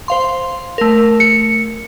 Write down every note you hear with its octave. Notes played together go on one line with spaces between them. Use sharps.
C5 F5 C6
A3 A#4
C#7